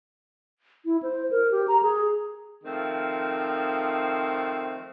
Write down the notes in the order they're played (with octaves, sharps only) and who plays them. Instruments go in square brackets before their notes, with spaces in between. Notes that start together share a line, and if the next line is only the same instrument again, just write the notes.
[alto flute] E4
C5
A#4
G4
A#5
G#4
[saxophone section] D#3 F3 A3 C4